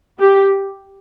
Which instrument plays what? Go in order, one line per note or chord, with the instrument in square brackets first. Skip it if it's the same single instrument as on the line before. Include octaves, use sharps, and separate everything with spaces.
[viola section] G4